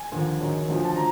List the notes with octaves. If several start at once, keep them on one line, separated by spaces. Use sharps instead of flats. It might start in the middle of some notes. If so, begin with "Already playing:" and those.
Already playing: G#5
D#2 D3 F3
F#1 F#2 D#3
D2 D3 F3
A5
F3 A#5